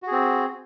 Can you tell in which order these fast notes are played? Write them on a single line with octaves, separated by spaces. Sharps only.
F#4 G#4 C4